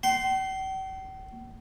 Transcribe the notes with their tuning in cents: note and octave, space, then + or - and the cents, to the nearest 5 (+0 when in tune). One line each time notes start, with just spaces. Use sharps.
G5 -45 C6 +0